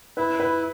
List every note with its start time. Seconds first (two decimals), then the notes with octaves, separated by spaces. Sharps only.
0.17 E4 B4
0.40 B4